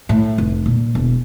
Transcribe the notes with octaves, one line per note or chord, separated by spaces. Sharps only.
A2
F1
A#2
E1